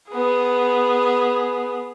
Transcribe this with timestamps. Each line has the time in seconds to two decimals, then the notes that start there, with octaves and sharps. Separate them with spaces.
0.10 B3 G#4